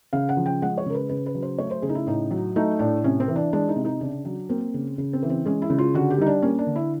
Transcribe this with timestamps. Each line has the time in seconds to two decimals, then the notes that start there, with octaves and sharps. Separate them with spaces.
0.13 C#3 F5
0.29 F#5
0.37 F3
0.46 G5
0.62 G#3 F#5
0.78 C#5
0.86 C#3 A#4
0.95 B4
1.10 C#3 B4
1.26 B4
1.35 F#3
1.42 C5
1.58 A3 C#5
1.71 C5
1.82 C#3 G#4
1.89 D#4
1.95 E4
2.06 A2 D#4
2.31 F#3
2.56 A3 D#4
2.79 A2 D4
3.04 C3 C#4
3.20 C4
3.28 E3
3.36 D4
3.53 G#3 D4
3.69 D#4
3.76 C3
3.85 D#4
4.01 C#3 D4
4.25 F#3
4.49 A#3 C4
4.74 C#3
4.98 C#3
5.13 C4
5.23 E3
5.30 C4
5.46 G#3 C#4
5.62 E4
5.70 C#3
5.78 F4
5.94 D3 F#4
6.10 G4
6.18 G3 D#4
6.27 D4
6.42 A#3 C#4
6.59 D4
6.67 D3
6.76 E4